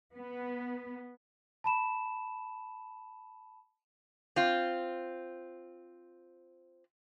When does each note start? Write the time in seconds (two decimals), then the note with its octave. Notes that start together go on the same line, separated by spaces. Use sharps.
0.17 B3
1.64 A5 B5 E7
4.36 C4 F4